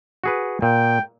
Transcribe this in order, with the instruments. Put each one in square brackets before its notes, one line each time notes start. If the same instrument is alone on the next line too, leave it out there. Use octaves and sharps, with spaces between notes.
[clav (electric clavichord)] F#4 G#4 B4
[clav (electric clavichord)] A#2 [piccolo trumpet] G5